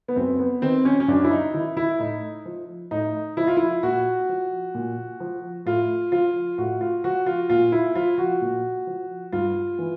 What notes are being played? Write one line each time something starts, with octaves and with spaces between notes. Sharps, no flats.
B3
F#2 C4
B3
D#3 C4
C#4
C#4
F#2 D4
E4
D#4
D#3 E4
E4
A2 D#4
F3
A2 D#4
F3 E4
F4
E4
A#2 F#4
F3
A#2
F3
A2 F4
F3 F4
A2 F#4
F4
F3 F#4
F4
A#2 F4
E4
F3 F4
F#4
A#2
F3
G2 F4
E3